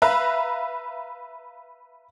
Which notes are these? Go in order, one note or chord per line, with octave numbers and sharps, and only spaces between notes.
B4 E5 F5 A#5 F#6